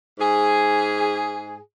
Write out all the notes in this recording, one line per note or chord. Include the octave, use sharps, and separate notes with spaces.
G#2 G#4